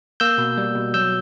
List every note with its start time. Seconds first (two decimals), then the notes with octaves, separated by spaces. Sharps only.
0.20 A#3 E6 G6
0.38 B2
0.58 G3
0.75 B2
0.94 F#3 E6 G6